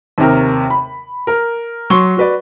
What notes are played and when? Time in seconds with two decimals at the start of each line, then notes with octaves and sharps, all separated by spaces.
0.18 D#2 C3 A#4
0.70 B5
1.27 A#4
1.90 F#3 C6 C#6 G7
2.17 F#4 B4 D5